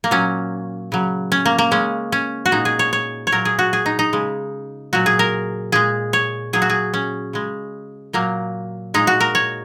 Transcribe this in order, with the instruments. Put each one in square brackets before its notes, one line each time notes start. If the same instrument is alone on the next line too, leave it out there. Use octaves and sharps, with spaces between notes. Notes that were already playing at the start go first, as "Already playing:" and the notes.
[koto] A#3
A#2 F#3 C#4
C#3 F#3
C#4
A#3
A#3
C#3 G#3 C#4
C#4
F#4
A#2 G#3 D#4
G#4
C#5
C#5
C#5
A#2 F#3 A#4
G#4
F#4
G#4
D#4
D#4
C#3 G#3
A#2 F#3 F#4
G#4
A#4
A#2 G#3 G#4
C#5
A#2 F#3 G#4
F#4
G#4
C#4
C#3 G#3
A#2 F#3 A#3
A#2 G#3 D#4
F#4
A#4
C#5